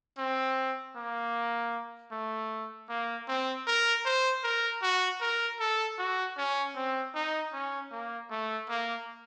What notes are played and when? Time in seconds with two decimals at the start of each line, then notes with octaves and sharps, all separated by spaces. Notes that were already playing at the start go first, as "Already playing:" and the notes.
0.18 C4
0.96 A#3
2.12 A3
2.89 A#3
3.28 C4
3.67 A#4
4.05 C5
4.44 A#4
4.82 F#4
5.21 A#4
5.60 A4
5.98 F#4
6.37 C#4
6.76 C4
7.15 D#4
7.53 C#4
7.92 A#3
8.31 A3
8.69 A#3